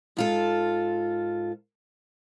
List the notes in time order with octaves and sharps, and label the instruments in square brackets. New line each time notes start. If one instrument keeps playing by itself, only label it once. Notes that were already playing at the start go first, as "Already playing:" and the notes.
[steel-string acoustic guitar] G#2 F4 A4